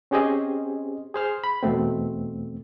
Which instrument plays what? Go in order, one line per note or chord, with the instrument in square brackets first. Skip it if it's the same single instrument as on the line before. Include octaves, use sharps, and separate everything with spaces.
[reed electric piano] C4 C#4 G4 G#4 C5 D#5
G#4 C5 F6
B5
E2 B2 A3 C4